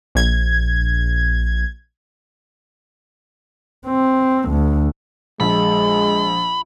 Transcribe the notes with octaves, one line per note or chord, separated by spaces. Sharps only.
A#1 G#6
C4
D2
A#1 G#3 B5